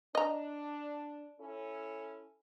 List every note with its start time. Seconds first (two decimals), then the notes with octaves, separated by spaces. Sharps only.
0.15 D4 D#5 A#5
1.39 C#4 E4 A4